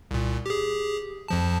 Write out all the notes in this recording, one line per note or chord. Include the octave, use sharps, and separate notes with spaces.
C2 A#2
G4 G#4
F2 F3 A5